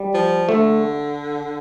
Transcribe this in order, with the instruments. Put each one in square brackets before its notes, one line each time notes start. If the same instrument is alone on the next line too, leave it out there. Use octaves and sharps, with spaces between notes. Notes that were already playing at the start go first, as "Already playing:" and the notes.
Already playing: [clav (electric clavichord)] G3
[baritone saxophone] F3
[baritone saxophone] D3 [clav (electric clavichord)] A3